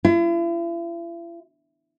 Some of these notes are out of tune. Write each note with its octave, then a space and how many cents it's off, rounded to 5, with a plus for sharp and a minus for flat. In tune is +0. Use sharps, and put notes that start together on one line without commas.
E4 +45